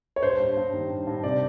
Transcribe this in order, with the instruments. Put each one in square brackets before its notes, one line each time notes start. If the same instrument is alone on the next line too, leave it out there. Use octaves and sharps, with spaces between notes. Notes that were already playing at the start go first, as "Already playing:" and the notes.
[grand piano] C#5
G2 C5
G2
G2
D#3
G2
G2
C3 D5